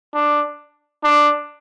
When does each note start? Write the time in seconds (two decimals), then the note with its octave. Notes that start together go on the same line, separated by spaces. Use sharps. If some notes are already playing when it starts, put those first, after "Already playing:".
0.14 D4
1.03 D4